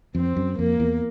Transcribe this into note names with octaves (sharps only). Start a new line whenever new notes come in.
F2 C4
F#2
F2 A#3
E2